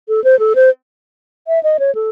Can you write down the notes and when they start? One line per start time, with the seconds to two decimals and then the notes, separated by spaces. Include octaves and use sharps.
0.09 A4
0.24 C5
0.39 A4
0.55 C5
1.48 E5
1.63 D#5
1.79 C#5
1.95 A4